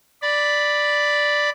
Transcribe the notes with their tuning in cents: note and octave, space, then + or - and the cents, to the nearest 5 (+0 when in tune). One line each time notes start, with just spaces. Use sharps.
D5 +0 B5 +0